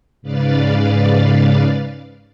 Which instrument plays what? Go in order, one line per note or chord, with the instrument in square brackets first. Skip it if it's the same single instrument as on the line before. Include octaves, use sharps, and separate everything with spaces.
[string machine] G#2 C#3 B4 D5 F5 A6